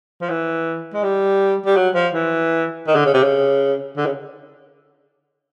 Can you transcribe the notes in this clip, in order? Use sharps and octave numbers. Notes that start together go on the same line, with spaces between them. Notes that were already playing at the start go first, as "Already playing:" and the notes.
F3
E3
G#3
G3
G3
F#3
F3
E3
D#3
D3
C#3
C3
C#3
D3
C#3